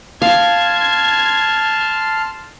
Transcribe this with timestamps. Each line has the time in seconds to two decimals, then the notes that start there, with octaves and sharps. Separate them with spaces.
0.22 F5 A5 C6 F6 G#6